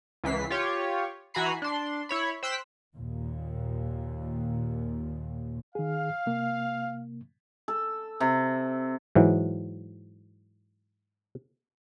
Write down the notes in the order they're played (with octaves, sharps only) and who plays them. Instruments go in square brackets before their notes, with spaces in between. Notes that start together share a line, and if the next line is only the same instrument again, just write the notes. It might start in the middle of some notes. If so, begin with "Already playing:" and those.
[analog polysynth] C#2 E3 B6 C7
F4 G4 C#5
E3 F#4 G#5 A#5 B5 C7
D4 C6
E4 C#5 B5
C5 G5 E6 F#6 B6
[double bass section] D#2 A#2
[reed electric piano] D#3 G#4 [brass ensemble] F5
[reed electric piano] C3 A#3
[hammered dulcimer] A4
C3
[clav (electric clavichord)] G#2 E3 F#3